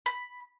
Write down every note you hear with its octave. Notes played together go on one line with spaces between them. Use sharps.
B5